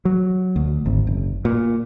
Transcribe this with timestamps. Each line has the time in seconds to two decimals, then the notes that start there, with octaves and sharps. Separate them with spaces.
0.05 F#3
0.56 D2
0.86 G#1
1.07 F#1
1.45 A#2